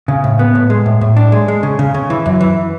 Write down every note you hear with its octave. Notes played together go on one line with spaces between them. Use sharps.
C#3
A2
B3
A2
G#3
A2
A2
D4
G#3
G#3
C#3
C#3
C#3
E3
F#2
E3